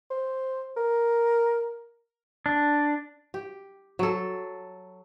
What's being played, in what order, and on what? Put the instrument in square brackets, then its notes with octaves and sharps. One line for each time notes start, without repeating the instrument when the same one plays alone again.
[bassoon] C5
A#4
[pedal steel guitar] D4
[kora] G4
F#3 A4